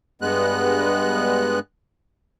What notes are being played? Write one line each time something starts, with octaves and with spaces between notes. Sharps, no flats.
G2 G#3 B3 F#6